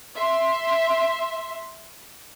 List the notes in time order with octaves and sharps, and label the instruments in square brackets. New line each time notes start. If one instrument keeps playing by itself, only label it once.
[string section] E5 C6